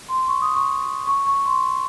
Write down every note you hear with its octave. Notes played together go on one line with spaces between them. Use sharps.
C6
C#6
D#6
C#6
C#6
C#6
C6